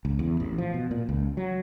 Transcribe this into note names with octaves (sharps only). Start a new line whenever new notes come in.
C#2
E2
A1
F3
B2
A#2
C#2
F#3